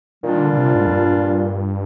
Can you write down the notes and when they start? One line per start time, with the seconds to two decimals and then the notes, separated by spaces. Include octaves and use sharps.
0.23 A#2 D#3 G3 D4 F4
0.40 D3
0.53 D3
0.57 C3
0.75 G#2
0.86 F2
0.92 G2